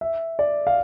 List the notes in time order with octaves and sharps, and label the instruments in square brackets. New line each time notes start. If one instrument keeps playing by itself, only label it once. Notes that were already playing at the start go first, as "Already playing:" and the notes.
[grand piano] E5
D5
F5